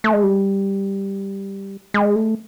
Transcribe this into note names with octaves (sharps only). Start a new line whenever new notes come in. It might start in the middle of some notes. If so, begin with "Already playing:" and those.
A3
G#3
G3
G#3
A3